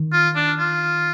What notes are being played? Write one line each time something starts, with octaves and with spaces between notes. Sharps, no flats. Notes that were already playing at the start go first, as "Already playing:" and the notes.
Already playing: D#3
F4
D4
F4